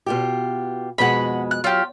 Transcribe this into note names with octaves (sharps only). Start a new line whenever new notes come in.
B2 F4 G4
F2 B2 G#3 F#5 B5
F#6
F#3 F4 G4